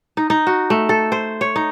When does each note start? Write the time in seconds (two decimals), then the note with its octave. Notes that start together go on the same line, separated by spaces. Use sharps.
0.17 D#4
0.30 D#4
0.47 F#4
0.70 A3
0.89 A4
1.12 C5
1.41 C#5
1.56 D#4